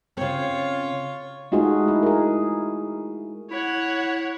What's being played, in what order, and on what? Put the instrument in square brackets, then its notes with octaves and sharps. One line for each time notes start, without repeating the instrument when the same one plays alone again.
[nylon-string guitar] C#3 C4 [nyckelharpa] F4 C#5
[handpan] G#3 A3 D#4 F4 F#4 G#4
E4
G#4 A#4
[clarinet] E4 [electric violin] C#5 F#5